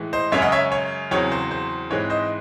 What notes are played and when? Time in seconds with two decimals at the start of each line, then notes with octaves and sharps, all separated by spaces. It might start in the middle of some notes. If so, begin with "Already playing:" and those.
Already playing: A2 E3 G#3
0.13 C5 D#5
0.32 F#2 C#3 G#3 C#4 C#5 E5
0.42 D#5 F#5
0.52 C#5 E5
0.72 C#5
1.11 E2 C#3 F#3 C4 C#5
1.32 C5
1.51 C5
1.90 G#2 E3 G#3 C4 C#5
2.10 C5 D#5